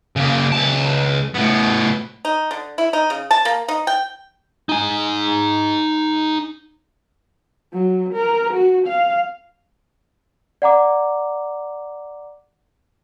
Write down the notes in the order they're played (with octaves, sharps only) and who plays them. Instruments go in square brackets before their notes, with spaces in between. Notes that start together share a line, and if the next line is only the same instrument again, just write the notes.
[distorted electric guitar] C#3 A#3
C#2 A5
A2 B3
[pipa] D#4
D3
E4
D#4
C#3
A5
A#3
D#4
G5
[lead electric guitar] D#4 G#5
[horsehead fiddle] F#3
A#4
F#4
F5
[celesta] D5 F#5 A#5 D6